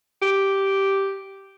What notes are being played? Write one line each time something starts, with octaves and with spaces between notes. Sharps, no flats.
G4